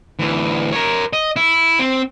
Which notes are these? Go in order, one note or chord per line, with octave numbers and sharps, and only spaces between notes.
D2 E3
A#4 C#5
D#5
E4
C4